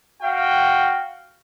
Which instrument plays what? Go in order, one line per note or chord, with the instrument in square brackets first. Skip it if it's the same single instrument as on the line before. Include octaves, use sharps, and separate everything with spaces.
[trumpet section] F#4 F5 G5